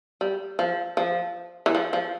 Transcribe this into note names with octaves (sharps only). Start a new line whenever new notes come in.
G3
F3
F3
E3
F3
F3